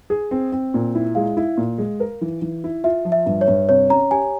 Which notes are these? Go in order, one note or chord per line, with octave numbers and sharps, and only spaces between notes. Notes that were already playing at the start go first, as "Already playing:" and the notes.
G#4
C4
C4
A#2
E4
G#3 F5
E4
A#2
G#3
A#4
E3
E3
E4
F4 E5
F3
E5
G2
C#5
G2
C3 C#5
C#4 A#5
G4 G#5